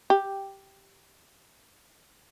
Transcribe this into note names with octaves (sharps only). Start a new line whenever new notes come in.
G4